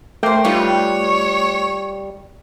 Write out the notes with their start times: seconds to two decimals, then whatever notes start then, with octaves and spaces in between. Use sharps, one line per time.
0.23 A3 A#3 C5 G5
0.45 G3 D#4 F4 B4 C#5